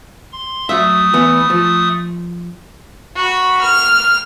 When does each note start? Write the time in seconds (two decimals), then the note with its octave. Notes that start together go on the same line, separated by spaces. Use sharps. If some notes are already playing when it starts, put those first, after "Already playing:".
0.32 C6
0.69 F#3 A3 E5 D#6
1.14 E3 B3
1.50 F3
3.16 F#4 B5
3.61 F6